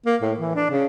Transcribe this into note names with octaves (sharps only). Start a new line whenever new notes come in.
A#3
A2
E3
D4
C#3